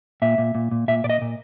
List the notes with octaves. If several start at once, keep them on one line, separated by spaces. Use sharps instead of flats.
A#2 E5
A#2
A#2
A#2
A#2 E5
A#2 D5
D#5
A#2